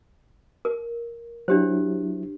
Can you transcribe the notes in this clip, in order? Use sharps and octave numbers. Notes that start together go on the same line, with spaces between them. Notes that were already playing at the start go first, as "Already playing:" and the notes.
A#4
F#3 D4 E4 G4 C5